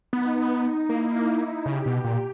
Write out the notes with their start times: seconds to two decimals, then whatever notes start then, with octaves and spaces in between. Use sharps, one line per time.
0.12 B3 D#4
0.50 D#4
0.89 A#3 E4
1.66 C#3 G4
1.86 B2
2.04 A#2